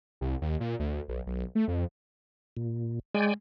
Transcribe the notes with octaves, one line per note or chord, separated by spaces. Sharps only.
C2
D#2
A#2
D2
B1
B1
A3
F2
A#2
G#3 D5 G5 G#5